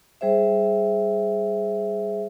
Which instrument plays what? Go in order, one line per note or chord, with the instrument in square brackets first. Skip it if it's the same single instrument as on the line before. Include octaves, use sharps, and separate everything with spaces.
[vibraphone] G3 G#4 C5 E5